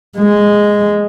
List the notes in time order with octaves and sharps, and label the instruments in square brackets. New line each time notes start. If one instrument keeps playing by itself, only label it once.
[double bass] G#3